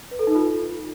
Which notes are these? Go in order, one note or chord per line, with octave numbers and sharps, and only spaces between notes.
B4
A4
D#4
F4